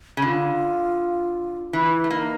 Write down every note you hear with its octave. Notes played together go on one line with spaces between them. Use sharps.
C#3
D3 F4
E3 E4
A3
A#3 D#4